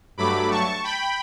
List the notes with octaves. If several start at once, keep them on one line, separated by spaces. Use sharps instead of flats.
G2 F#3 A3 B5 D6
A5 C#6
G5 B5